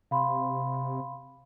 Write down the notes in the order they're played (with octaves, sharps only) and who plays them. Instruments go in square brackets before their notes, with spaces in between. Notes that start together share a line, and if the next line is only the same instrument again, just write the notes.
[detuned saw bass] C3 [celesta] F5 B5 C6